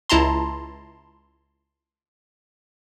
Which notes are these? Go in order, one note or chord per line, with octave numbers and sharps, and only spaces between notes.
C#2 E4 A5 A#5 C6